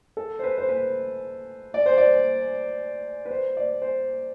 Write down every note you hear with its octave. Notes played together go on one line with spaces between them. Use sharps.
A4
C5
B4
C5
B4
D5
C5
D5
B4
C5
D5
C5